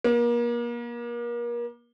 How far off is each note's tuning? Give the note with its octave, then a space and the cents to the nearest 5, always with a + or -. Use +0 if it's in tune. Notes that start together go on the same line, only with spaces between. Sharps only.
A#3 +35